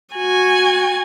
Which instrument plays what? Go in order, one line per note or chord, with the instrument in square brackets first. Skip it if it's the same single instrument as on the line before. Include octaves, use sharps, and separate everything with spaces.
[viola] F#4 G#5